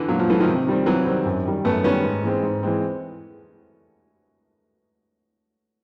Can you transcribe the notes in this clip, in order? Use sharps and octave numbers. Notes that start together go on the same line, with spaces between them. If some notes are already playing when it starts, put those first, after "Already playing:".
Already playing: D3 E3
A#2 F#3
F3
E3 F#3 A3
D#3 F3
C3
D#3 G3 C4
C3 E3 F#3
D#3 G3 C4
F#2
D#3 G3
F#2 A3 B3
D#3 G3 B3 C#4
G#2
E3 G#3 C4
G#2
E3 G#3 C4